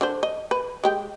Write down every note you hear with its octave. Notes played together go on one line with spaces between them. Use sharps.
D3 D4 C5
D#5
B4
G#3 G4 G5